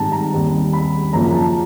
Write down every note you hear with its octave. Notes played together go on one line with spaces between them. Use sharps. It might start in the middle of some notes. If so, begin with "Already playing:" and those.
Already playing: G#2 D#3 G3 C4 A5 A#5
A#5
D#2 D#3 G3 C4
B5
F#2 C#3 F3 A#3 A#5
A5